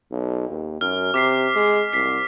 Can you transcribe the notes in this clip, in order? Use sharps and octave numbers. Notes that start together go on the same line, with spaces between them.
B1
D#2
F#2 F6
C3 D6 B6 C7
G#3
C2 B6 C7